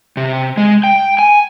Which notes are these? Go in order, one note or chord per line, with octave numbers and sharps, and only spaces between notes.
C3
G#3
G5
G#5